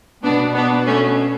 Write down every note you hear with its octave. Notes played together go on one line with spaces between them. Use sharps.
B2 B3 D4
B3 D4
A3 C#4